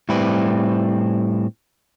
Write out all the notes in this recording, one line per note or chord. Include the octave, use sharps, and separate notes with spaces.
A2 G3 C4 E4 B4